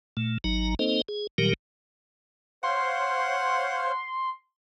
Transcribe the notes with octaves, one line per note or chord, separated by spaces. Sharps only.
A#2 A3
G#1 F#3 D#4 A#5
A#3 C4 D#4 A4 C5 D#5
G#4
A#2 D#3 F#3 G3 G4 A#4
C5 C#5 F5 F#5 C6